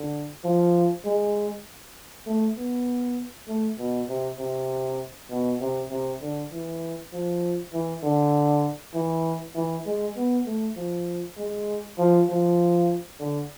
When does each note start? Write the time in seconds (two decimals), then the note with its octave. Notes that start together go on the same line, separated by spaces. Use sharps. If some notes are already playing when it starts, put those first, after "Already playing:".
Already playing: D3
0.44 F3
1.05 G#3
2.26 A3
2.57 B3
3.48 A3
3.78 B2
4.08 C3
4.38 C3
5.30 B2
5.61 C3
5.91 C3
6.21 D3
6.52 E3
7.12 F3
7.73 E3
8.03 D3
8.94 E3
9.55 E3
9.86 G#3
10.16 B3
10.46 A3
10.76 F3
11.37 G#3
11.98 F3
12.29 F3
13.20 D3